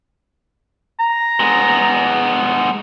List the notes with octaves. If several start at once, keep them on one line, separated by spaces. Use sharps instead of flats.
A#5
G#3 B3